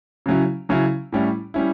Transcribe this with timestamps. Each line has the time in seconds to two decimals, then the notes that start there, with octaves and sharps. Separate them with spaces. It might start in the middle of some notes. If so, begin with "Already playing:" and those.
0.26 C#3 F#3 C#4 E4
0.69 C#3 F#3 C#4 E4
1.12 A2 G3 C#4 E4
1.54 G3 C#4 E4